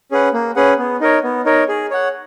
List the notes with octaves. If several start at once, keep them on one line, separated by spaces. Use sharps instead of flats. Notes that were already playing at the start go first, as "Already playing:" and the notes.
C#4 G#4 B4 F#5
A#3
C#4 G#4 B4 F#5
B3
D#4 A#4 C#5
B3
D#4 A#4 C#5
G#4
C#5 F#5